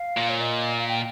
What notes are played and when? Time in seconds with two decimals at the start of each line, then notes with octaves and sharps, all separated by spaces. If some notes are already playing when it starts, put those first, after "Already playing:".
Already playing: F5
0.17 A#2
0.29 C#5
0.41 D#5
0.78 F5
0.89 G5